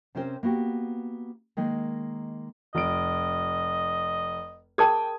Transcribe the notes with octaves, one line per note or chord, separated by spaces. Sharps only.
C3 C4 C#4 A#4 C5
A#3 B3 F#4 G4
D#3 G#3 A#3 D#4
F1 D#5 D7
G#4 A#4 G5 A5 D#6 G#6